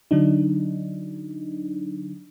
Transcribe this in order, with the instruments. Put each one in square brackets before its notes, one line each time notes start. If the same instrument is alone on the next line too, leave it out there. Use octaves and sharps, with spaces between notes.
[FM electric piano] D3 F#3 D4 D#4